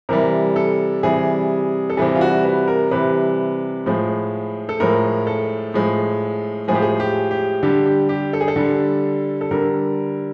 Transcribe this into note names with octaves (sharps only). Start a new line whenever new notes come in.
C3 E3 G3 A#4
A4
C3 E3 G3 G#4
A4
C3 E3 G3 G#4
F4
F#4
B4
A#4
C3 E3 G3 B4
A2 F3 G#3
A4
A2 F3 G#3 A#4
A4
A2 F3 G#3
A2 F3 G#3 G#4
G4
G#4
G4
G4
D3 G3 G4
G4
G4
A4
G#4
A4
D3 G3
A4
D3 G3 A#4